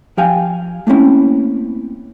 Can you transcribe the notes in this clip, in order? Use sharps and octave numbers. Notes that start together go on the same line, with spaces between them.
F3 G4 F5 G5 G#5
A3 A#3 C4 C#4 E4